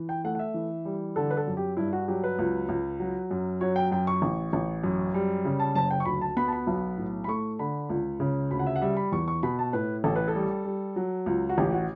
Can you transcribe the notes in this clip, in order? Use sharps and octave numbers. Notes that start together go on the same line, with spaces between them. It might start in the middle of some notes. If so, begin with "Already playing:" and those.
Already playing: E3
G5
A3 F#5
F#5
E5
E3
G3
D3 A4
B4
A4
F#2
G4
G2 E4
F#4
F#3 G4
B4
C#2
C#2
F#3
F#2
F#3 C#5
G5
F#2 G5
C#6
A1
A1
F#2
G3
C#3
A5
F#1 A5
G5
C#6
D2 B5
A5
B3 B5
A5
B5
B1
A2
B5
A3 C#6
D3 B5
C#2
C#3
D2 B5
F#5
E5
F#5
G3 E5
B5
E2 C#6
C#6
B2 B5
A5
A2 B4
A1 A4
B4
A4
G3
G3
F#3
C#2
F#4
A1 G4
F#4